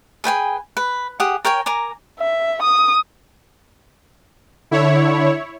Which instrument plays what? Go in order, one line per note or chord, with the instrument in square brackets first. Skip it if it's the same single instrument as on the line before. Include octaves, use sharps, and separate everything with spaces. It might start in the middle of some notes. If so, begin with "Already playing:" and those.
[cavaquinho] G#4 B4 G5 G#5
B4
G4 G#4 F#5 D#6
A#4 C#5 G5 G#5
A#4 G#5 A#5 D6
[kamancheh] E5
D#6
[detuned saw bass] D3 [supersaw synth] E4 C#5